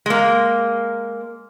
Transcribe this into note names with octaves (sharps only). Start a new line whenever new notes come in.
G#3 A#3